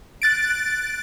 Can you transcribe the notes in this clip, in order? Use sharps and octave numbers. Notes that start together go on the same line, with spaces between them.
F#6 A6 D7